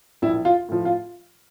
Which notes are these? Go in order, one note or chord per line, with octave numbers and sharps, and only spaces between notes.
A#1 E4
F4
A2 F3
F4